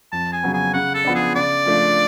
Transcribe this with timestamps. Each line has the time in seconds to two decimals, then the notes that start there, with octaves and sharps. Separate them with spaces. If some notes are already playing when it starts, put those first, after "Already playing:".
0.12 F2 A5
0.33 G#5
0.43 C#3 F#3 B3
0.54 G#5
0.74 C#3 F#5
0.95 A4
1.05 F3 B3 D4
1.15 G#4
1.35 C#3 D5
1.66 F3 A3 D4